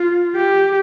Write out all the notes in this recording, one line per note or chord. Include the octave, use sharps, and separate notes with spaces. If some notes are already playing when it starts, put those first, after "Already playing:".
Already playing: F4
G4